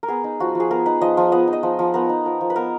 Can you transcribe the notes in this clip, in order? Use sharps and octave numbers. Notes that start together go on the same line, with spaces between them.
A#4
B3 G#4
D#4
F3 F#4
F3 G#4
B3 A#4
D#4 B4
F3 D#5
F3
B3 D#5
D#4
D#5
F3
F3
B3 A#4
D#4
F3 A#4
F3
B4
B3 A#4